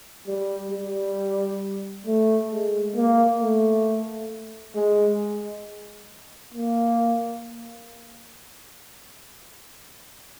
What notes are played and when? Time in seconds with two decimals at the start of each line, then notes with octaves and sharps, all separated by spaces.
0.28 G3
0.72 G3
2.07 A3
2.52 G#3
2.96 A#3
3.41 A3
4.75 G#3
6.55 A#3